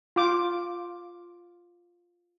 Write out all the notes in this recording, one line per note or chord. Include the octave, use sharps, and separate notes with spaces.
F4 D6